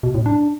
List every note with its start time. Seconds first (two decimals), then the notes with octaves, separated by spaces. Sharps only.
0.03 B2
0.15 A2
0.26 D4